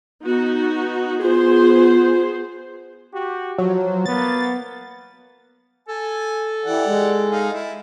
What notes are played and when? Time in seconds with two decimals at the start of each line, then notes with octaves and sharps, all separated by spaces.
0.23 B3 D#4 F#4
1.22 B3 F4 G#4 C5
3.12 F#4 G4
3.58 F3 F#3
4.06 A#3 B3 A6
5.89 A4 G#5
6.65 E3 G4 D5 F#5
6.86 G#3
7.31 D#4 G#4 F5
7.53 E4